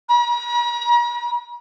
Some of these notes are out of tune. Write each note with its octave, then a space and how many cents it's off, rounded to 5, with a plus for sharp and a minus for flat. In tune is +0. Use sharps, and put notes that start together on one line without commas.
A#5 +45